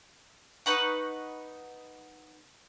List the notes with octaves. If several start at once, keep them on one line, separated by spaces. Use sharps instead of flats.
D#4 B4 F#5 C#6